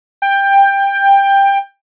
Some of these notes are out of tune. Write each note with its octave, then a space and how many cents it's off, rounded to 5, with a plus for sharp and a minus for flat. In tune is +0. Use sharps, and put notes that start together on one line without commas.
G5 +15